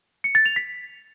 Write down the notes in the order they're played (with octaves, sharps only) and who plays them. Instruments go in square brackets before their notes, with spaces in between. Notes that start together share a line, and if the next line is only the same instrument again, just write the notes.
[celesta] C#7
A6
F7
B6